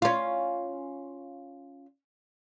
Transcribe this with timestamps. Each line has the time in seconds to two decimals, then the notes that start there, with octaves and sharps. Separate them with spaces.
0.02 C#4 F4